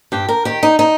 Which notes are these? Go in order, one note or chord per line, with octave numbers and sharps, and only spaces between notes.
G2 G4
A#4
D#3 G4
D#4
D#4